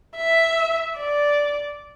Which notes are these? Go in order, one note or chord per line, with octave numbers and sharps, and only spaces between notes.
E5
D5